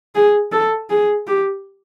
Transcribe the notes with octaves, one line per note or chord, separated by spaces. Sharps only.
G#4
A4
G#4
G4